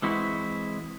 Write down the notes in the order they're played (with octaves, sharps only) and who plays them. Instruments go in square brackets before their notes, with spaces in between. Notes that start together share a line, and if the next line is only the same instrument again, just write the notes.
[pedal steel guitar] E3 G#3 C4 E4 F#4